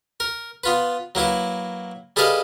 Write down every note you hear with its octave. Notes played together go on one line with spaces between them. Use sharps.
A#4
B3 F4 B4
F#3 A#3 E4 B4
G3 G#4 A4 B4 D#5 F5